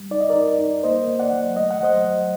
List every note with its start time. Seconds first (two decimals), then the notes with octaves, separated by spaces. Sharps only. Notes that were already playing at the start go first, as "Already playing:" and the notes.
Already playing: G3
0.11 D#4 D5
0.21 D#5
0.29 A#4 D5
0.35 D#4
0.59 D#4
0.83 A#3 C5 D#5
1.08 A#3
1.20 D5 F#5
1.32 F#3
1.56 A3 D#5
1.71 F#5
1.81 F#3 C5 D#5
2.05 F#3